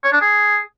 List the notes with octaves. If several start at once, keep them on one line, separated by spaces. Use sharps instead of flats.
C#5
D4
G#4